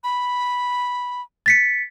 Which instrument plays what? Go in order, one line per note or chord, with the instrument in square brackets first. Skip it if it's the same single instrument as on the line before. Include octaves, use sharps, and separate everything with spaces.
[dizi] B5
[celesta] A6 B6 C#7